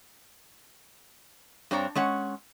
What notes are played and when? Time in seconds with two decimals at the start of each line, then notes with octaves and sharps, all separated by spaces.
1.71 G2 C4 D4 C#5 A#5
1.95 G#3 C#4 C#5 F#5